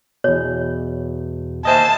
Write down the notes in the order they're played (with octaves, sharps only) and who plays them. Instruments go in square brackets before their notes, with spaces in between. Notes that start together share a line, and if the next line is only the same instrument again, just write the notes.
[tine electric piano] E2 B2 [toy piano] C#5
[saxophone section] D#2 C5 E5 [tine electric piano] D#5 G#5 [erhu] A5